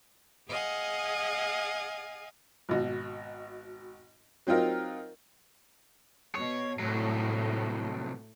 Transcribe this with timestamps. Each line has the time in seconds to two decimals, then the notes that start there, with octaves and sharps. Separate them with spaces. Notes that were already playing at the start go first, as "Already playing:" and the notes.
0.49 G#4 D#5 F5 F#5 G#5
2.69 G#1 B2
4.47 F#3 C4 D#4 F4 A#4
6.35 B2 C#5
6.79 C2 A2 F#3